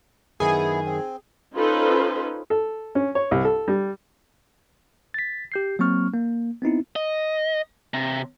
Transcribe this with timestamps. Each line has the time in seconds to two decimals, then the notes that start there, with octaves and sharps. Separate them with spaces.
0.40 F#2 D#3 B3 E4 G#4 G#5
0.86 C4
1.56 C#4 D#4 F4 A4 B4 C5
2.50 A4
2.95 C#4
3.15 C#5
3.31 C2
3.45 A4
3.68 G3
5.14 A6 B6
5.52 G4 G6 C7
5.79 F#3 A#3 C4 C#6 F6
6.14 A#3
6.62 B3 C4 D#4 E4
6.96 D#5
7.94 C3